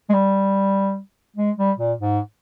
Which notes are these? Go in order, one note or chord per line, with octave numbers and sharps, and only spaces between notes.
G#3
G3
G#3
G3
A#2
G#2